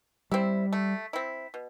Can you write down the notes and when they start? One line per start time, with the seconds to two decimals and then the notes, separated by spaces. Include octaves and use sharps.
0.31 G3 C4 E4
0.73 A3
1.13 C4 E4
1.54 B2